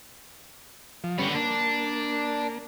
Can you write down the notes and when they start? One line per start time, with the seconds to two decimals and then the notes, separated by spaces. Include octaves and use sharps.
1.04 F3
1.19 D3 G3 B3 C#4
1.35 A#3 D4